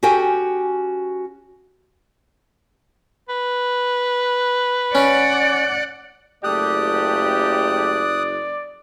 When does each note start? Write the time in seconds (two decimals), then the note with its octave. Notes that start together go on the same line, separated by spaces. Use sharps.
0.03 C#4 F#4 G4 A4 G5 G#5
3.29 B4
4.95 C#4 D5 F#5
6.44 F#1 A3 G4 D5 D#6 F#6